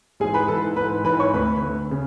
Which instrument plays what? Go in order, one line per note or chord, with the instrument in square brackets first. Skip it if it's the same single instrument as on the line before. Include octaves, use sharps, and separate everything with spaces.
[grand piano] G#2 G#4 G#5
E3
B4 B5
G#2 E3 A4 A5
G#2 B4 B5
E3
G#2 E3 B4 B5
C#5 C#6
D2 D3 B4 B5
D2 D3
C#3